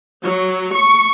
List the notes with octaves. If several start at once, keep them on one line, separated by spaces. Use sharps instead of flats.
F#3
C#6